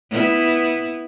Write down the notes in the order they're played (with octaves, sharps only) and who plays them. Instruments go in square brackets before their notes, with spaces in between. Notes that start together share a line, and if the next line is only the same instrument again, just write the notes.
[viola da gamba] B3 E4